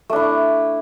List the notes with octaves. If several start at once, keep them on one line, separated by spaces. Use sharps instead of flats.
A3 D4 E4